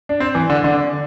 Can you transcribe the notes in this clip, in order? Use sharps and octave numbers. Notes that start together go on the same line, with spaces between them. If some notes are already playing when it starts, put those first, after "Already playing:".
D4
C4
E3
D3
D3